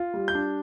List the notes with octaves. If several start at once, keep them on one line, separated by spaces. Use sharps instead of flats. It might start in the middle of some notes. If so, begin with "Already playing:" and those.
Already playing: F4
G3
G6
D4